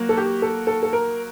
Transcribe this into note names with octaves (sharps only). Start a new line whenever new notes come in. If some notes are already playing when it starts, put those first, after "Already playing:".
Already playing: F#3 A#3 F#4
A4
G4
A4
A4
A4
A#4